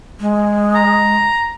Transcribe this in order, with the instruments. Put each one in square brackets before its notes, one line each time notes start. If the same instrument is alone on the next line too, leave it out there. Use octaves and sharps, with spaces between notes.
[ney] G#3
[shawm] A#5